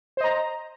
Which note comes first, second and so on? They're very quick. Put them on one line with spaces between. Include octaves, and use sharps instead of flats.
C5 D#5 A#5